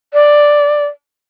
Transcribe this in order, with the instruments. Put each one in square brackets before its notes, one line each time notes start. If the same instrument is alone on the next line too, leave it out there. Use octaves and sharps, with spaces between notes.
[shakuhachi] D5